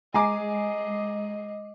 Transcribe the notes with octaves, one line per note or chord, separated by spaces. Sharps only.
G#3 D#5 G#5 A#5 D6 C7